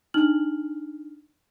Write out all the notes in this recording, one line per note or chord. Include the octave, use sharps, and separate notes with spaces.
D4 D#4 F6 F#7